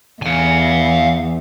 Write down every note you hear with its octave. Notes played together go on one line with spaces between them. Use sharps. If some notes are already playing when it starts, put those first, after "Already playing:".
E2 F5 G#5